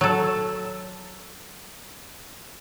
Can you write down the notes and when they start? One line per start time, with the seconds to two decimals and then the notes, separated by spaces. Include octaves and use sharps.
0.01 F#3 A4